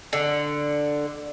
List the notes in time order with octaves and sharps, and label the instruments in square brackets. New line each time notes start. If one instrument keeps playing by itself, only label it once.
[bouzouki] D3